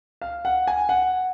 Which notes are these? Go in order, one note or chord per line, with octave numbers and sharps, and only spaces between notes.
F5
F#5
G#5
F#5